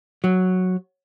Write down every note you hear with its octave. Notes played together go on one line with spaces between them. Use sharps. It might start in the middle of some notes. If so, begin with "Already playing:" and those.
F#3